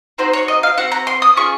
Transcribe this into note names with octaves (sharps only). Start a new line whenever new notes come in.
C4 D#4 F#4 C5
C#5
D#5
F5
C4 F#4 F#5
A#5
C6
D#6
C#4 F4 G#4 C#6